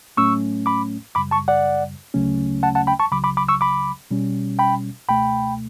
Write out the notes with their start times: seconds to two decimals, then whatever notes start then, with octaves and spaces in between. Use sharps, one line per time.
0.17 A2 F#3 A3 C#4 C#6 E6
0.66 B5 D6
1.15 F#2 C#3 G3 B5 D6
1.31 A5 C#6
1.48 D5 F#5
2.14 D2 C#3 F#3 A3 C#4
2.63 F#5 A5
2.75 F#5 A5
2.87 G5 B5
3.00 A5 C#6
3.12 C#2 C#3 F#3 B5 D6
3.24 B5 D6
3.37 B5 D6
3.49 C#6 E6
3.61 B5 D6
4.11 B2 G3 C#4
4.59 G5 B5
5.08 C#2 B2 A3 G5 B5